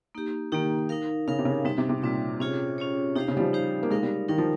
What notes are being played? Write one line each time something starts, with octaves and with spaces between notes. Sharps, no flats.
A#3 D#4 G4
D#3 A#3 D#4 G4
D#4 A#4 F5
C#3 D#4 A#4 F5
C3
C#3
C3 G3 C4 D#4
C3
C3
A#2 G3 C4 D#4
C3 C#4 F4 G#4 C#5
C#4 F4 G#4 C#5
C3 D#4 G4 C5 F5
C#3
G3
F3
D#4 G4 C5 F5
A#3
G#3 D#4 A#4 F5
G3
D#3 D#4 A#4 F5
F3